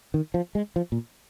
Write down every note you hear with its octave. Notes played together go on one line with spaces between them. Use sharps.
D#3
F3
G#3
F3
A#2